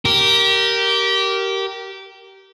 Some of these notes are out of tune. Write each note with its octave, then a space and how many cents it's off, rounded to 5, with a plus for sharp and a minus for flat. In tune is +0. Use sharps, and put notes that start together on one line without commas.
G4 -20 A#4 +0